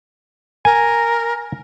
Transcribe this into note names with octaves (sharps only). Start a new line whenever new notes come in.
A#4 G#5